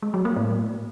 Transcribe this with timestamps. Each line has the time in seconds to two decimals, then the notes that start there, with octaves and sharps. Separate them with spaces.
0.03 G#3
0.14 F#3
0.25 A#3
0.36 A2